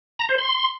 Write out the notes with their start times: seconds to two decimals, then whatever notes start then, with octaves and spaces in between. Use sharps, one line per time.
0.19 A#5
0.29 C5
0.38 C6